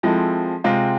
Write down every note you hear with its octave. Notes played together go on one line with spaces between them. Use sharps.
F3 G#3 C4 E4 A4
C3 G#3 C4 F4